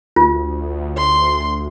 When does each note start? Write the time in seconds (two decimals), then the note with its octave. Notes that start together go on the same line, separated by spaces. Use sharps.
0.16 D2 F4
0.97 C6